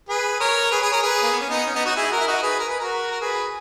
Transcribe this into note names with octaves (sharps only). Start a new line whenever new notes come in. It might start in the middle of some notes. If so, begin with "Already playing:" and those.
G#4 B4
A#4 C#5
G#4 B4
G#4 B4
A#4 C#5
G#4 B4
A#3
B3
C#4
B3 D#4
C#4
B3 D#4
D#4 F#4
E4 G#4
F#4 A#4
E4
D#4 F#4
G#4 B4
A#4
B4
F#4 A#4
A#4
G#4 B4